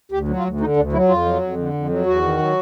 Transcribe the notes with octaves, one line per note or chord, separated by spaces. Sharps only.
D2 G4
F#3
F4
D2
D3 D#4
D2 D4
F#3 E4
F2 F4
F#3
F2
D3
F2
F#3
E2 F#4
D#3
F#3